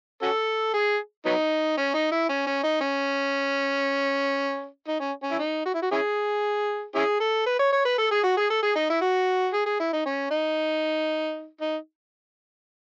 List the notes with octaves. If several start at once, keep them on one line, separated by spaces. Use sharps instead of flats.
C#4 F#4 A4
G#4
F#3 B3 D#4
C#4
D#4
E4
C#4
C#4
D#4
C#4
D#4
C#4
C#4
E4
D#4
F#4
E4
F#4
C#4 E4 G#4
C#4 E4 G#4
A4
B4
C#5
C#5
B4
A4
G#4
F#4
G#4
A4
G#4
D#4
E4
F#4
G#4
G#4
E4
D#4
C#4
D#4
D#4